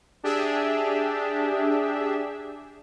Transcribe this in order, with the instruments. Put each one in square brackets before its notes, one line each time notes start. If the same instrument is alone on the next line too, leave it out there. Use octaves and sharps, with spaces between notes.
[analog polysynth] D4 G4 G#4 E5